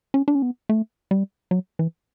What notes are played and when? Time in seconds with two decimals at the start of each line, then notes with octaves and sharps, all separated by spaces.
0.14 C#4
0.28 D4
0.35 C#4
0.42 B3
0.69 A3
1.11 G3
1.51 F#3
1.79 E3